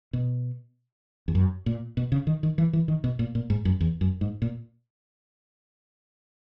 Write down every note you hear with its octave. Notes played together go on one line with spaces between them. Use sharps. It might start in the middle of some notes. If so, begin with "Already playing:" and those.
B2
E2
F#2
A#2
B2
C#3
D#3
D#3
E3
E3
D#3
B2
A#2
A#2
G#2
F#2
E2
F#2
G#2
A#2